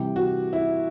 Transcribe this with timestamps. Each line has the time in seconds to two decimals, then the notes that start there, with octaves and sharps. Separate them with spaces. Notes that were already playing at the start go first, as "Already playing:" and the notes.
Already playing: C3 E3 G3 G4
0.16 F#4
0.53 E4